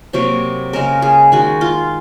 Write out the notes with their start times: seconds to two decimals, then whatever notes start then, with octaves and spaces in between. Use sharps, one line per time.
0.13 C3 F#3 A#3 C#5
0.73 C#3 G#3 A#4
1.02 G#4
1.32 D#3 G#3 F#4
1.61 F4